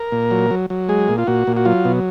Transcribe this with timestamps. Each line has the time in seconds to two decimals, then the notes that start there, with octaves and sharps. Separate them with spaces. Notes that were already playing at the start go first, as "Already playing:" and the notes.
Already playing: A#4
0.12 A#2
0.31 F#3
0.51 F#3
0.70 F#3
0.89 G#3 G#4
1.08 A#2
1.18 F4
1.27 A#2 F#4
1.47 A#2
1.57 F#4
1.65 F#3 F4
1.85 B2